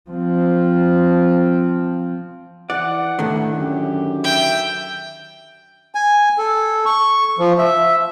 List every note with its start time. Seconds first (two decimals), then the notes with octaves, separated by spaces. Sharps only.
0.10 F3 C4
2.70 E3 D5 F#5
3.19 D#2 A2 D3 D#3
3.58 F#2 G4
4.24 E5 G5
5.95 G#5
6.38 A4
6.86 C#6
7.38 F3
7.58 E5